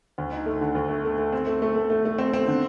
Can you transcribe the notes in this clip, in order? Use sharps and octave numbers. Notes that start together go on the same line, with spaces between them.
D2
D#4
A3
D3
D2
A3
A3
A3
C4
A3
A3
A3
A3
A3
C4
C4
D3